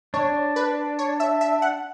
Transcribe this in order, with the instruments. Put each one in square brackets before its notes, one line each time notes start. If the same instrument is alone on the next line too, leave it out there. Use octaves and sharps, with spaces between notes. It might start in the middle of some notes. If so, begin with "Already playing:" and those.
[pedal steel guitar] D4 [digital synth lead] C#5
[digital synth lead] B4
C#5
E5
E5
F#5